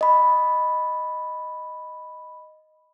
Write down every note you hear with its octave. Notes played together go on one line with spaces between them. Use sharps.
D#5 B5